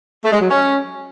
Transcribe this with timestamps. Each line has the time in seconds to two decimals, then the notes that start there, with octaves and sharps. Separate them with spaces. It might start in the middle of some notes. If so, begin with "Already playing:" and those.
0.24 A3
0.32 G#3
0.40 F#3
0.49 C#4